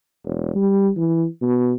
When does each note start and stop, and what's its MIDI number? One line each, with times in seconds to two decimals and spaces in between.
0.25 0.50 28
0.55 0.90 55
0.97 1.25 52
1.42 1.72 47